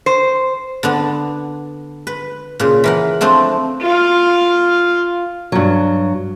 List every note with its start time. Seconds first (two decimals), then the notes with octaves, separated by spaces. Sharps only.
0.06 C5
0.83 D3 B3 D4
2.07 B4
2.60 A#2 C#3
2.84 E3 A#4 F#5
3.21 F3 A3 C4 D4
3.81 F4 F5
5.52 G2 F#3